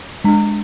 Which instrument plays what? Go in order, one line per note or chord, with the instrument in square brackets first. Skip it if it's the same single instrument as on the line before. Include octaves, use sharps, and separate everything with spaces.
[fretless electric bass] G#3 [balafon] D4